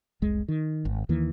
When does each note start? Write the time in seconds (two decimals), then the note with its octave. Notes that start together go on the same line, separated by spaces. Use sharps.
0.22 F1 C2 G#3
0.48 D#3
0.85 G#1
1.09 D#2 D#3 E3 A#3